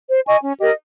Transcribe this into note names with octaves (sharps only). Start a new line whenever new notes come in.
C5
D#5 G#5 C#6
C#4
G4 A#4 D#5